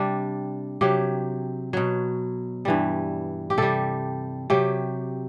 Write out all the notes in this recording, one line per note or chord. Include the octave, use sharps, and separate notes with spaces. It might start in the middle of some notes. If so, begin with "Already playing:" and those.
Already playing: C3 G3 D4
C3 F#3 G4
B2 F#3
G2 E3 G3
G4
C3 G3 A4
C3 F#3 G4